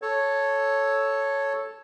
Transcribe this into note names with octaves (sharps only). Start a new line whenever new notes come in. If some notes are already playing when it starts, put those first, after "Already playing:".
A4 C#5